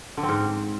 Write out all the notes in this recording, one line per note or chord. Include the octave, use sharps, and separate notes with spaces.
D3
C4
G#2